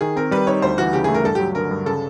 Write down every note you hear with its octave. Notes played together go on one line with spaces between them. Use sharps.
D#3 G#4
C4 A#4
G3 B4
D#4 C#5
D2 C5
E3 F#4
C#3 G4
A3 G#4
A#4
G2 A4
F#3 G4
D3 A#4
G2
C#3 A4